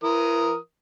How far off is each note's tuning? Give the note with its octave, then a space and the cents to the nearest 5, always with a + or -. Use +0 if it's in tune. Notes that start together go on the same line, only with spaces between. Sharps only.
E3 +35 A#4 +0 D#6 +0